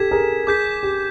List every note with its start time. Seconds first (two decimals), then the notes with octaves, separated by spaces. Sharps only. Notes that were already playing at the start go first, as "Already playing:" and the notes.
Already playing: G4 A4 G#6 B6 E7
0.11 G#4 A#4
0.47 G#4 D6 G6 B6
0.83 G4